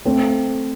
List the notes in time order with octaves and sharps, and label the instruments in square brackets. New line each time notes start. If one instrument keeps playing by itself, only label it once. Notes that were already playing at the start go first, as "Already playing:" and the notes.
[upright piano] A3 C4